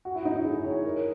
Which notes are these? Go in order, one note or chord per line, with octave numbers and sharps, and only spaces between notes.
F#4
E4
D#4
E4
G#4
E4
C#5
A#4